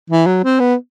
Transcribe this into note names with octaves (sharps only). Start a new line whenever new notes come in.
E3
F#3
C4
B3